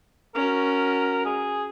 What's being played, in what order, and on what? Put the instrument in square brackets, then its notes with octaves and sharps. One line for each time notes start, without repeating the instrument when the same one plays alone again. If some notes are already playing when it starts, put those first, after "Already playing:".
[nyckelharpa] C#4 F#4 [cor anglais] A#4
[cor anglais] G#4